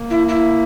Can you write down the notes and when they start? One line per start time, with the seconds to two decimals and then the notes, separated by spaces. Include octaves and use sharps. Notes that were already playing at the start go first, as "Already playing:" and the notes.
Already playing: A#3
0.10 E4
0.28 E4